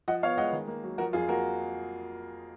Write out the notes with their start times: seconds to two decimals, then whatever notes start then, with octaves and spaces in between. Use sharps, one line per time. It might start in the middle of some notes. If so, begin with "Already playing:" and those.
0.08 F3 D#5 F#5
0.23 B3 C#5 F5
0.38 G#3 D#5 F#5
0.53 D#3
0.68 A#3
0.83 F#3
0.98 F3 F#4 A#4
1.13 F2 F4 G#4
1.29 A#3 F#4 A#4